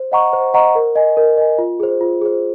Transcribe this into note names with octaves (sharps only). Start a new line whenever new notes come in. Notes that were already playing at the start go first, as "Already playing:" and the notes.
Already playing: C5
D#5 F#5 A#5 C#6
C5
D#5 F#5 A#5 C#6
A#4
D#5 G#5
A#4
D#5 G#5
F4
G#4 C5
F4
G#4 C5